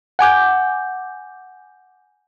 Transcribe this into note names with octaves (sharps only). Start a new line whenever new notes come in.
F#5 G#5 D6 G6